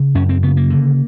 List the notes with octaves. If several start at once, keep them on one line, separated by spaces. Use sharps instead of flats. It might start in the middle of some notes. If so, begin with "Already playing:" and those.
Already playing: C#3
F#2 C#4
C4
C#3 B3
A#3
D3